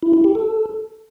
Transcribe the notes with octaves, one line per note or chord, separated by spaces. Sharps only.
E4
E4
G4
A4